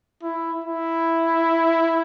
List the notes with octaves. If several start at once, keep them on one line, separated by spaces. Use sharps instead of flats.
E4
E4